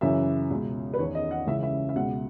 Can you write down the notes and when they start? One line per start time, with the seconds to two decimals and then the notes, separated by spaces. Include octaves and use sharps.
0.01 F#2 C#3 E3 E5
0.51 C#2 B2
0.94 B4
0.99 E2 D#3 C#5
1.15 D#5
1.31 F#5
1.47 C#2 C#3 E3 E5
1.63 E5
1.89 E5
1.96 C#2 B2 F#5